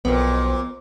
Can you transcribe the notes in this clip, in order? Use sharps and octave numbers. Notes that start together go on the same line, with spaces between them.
B1 F2 A#2 B3